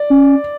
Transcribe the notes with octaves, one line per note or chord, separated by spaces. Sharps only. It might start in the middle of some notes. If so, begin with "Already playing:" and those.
Already playing: D5
C#4